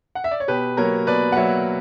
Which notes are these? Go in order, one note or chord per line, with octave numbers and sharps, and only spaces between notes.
F#5
E5
D5
C#5
B2 G4 B4
F#3 A#3 A#4 C#5
B2 B4 D5
F#5
F#3 A#3 C#5 E5